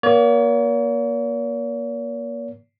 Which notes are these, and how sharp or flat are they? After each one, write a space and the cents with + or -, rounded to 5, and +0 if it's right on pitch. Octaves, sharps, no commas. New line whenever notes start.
A#3 +30 C#5 +45